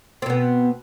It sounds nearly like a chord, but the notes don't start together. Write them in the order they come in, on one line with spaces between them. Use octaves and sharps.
C4 B2 B3